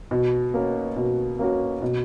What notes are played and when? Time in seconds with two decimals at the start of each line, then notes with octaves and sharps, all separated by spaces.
0.11 B2
0.54 A#3 C#4 F#4
0.96 B2
1.39 A#3 C#4 F#4
1.82 B2